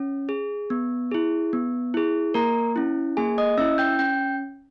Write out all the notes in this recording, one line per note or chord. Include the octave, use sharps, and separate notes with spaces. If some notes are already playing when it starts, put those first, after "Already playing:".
Already playing: C#4
G#4
B3
E4 G#4
B3
E4 G#4
A#3 A#4 A#5
C#4 E4
A#3 G#4 G#5
D#5 D#6
C#4 E4 E5 E6
G5 G6
C#4 G5 G6